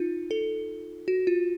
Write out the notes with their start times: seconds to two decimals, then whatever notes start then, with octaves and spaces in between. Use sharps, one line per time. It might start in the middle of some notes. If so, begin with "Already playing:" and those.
Already playing: D#4 F4
0.31 A4
1.08 F#4
1.27 F4